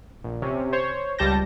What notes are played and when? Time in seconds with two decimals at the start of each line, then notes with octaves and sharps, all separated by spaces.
0.24 A#1
0.42 C3 C#4
0.73 C5 C#5
1.19 C#2 G3 A5 G6 A#6